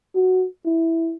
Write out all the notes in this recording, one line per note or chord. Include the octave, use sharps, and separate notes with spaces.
F#4
E4